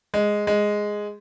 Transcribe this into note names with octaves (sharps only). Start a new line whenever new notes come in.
G#3
G#3